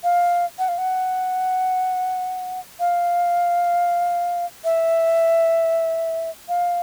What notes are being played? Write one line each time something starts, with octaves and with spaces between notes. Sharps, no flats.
F5
F#5
F5
F#5
F5
E5
F5